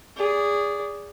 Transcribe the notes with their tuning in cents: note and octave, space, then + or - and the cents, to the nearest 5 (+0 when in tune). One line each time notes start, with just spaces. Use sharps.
G#4 -15 D5 -25